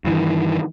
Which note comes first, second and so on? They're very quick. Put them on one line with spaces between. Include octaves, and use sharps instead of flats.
G2 E3 D#3